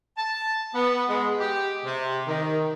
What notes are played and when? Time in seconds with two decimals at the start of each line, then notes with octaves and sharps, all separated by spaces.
0.17 A5
0.74 B3
1.09 G#3
1.38 G4
1.85 C3
2.27 D#3